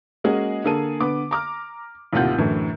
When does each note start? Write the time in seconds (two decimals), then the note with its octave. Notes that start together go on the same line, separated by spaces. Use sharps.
0.24 G#3 A#3 C#4 F#4 G#4 D#5
0.64 D3 A#3 G#4 A4 D#7
1.00 D3 B3 D6
1.31 A#5 D6 F6
2.13 A1 D#2 C3 F4 F#5 G6
2.38 F#2 A2 D3 E3